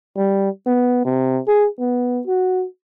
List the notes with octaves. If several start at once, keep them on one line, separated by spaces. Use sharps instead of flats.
G3
B3
C3
G#4
B3
F#4